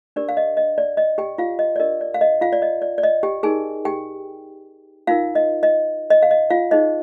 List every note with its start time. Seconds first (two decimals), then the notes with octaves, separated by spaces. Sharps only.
0.16 D4 G4 A#4 D5
0.29 F5
0.37 D#5
0.57 D#5
0.78 D5
0.97 D#5
1.18 G4 G5
1.38 F4 F5
1.59 D#5
1.76 D5
1.79 D4 G4 A#4 D#5
2.01 D5
2.14 F5
2.21 D#5
2.41 F4 F5
2.53 D5
2.62 D#5
2.82 D5
2.98 D5
3.03 D#5
3.23 G4 G5
3.43 D#4 G#4 A#4 G#5
3.85 G4 G5
5.07 D#4 F4 A#4 F5
5.35 D#5
5.63 D#5
6.10 D#5
6.22 F5
6.31 D#5
6.50 F4 F5
6.71 D#4 G#4 C5 D#5